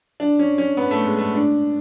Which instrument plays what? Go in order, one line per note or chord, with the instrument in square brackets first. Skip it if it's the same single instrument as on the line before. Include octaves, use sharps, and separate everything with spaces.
[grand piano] D4
C#4
C#4
B3
A3
G#3
A3
D4